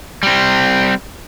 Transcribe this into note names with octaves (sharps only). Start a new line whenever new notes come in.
G3 C4